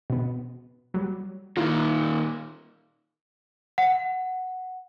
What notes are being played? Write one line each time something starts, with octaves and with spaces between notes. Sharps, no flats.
B2 B3
F#3 G3
A#2 D#3 E4 F4
F#5